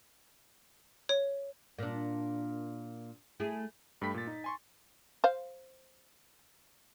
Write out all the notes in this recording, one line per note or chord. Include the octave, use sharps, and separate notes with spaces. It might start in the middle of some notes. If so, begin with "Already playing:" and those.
C#5
A#2 D4
A3 E4 G#4
G2 A3 A4 G5 B5 B6
A#2 A6
D#4
G#5 C6 C#6
C5 F5